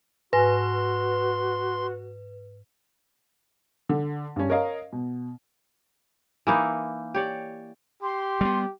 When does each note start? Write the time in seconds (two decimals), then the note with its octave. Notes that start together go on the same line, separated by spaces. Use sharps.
0.33 G#2 F#4 B4 G#5 C6 A#6
3.89 D3
4.36 G2 C#4
4.50 A#4 C#5 D#5 F5
4.93 B2
6.47 E3 A#3 D#4 E4
7.14 G4 C#5 D5
8.03 G4 C6
8.41 G3 A3 B3